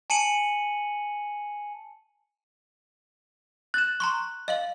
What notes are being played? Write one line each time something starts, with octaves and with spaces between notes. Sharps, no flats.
G#5 A5 C#7 D#7 F#7
F#6 A6 E7
A#5 C6 C#6
D#5 F5 F#7